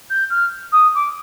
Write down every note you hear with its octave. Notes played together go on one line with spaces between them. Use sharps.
G6
F6
D#6
D6